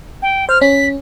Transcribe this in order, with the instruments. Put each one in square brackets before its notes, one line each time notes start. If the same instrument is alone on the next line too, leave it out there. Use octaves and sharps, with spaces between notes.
[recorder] G5
[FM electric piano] C5 [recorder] F6
[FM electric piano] C#4 [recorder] B6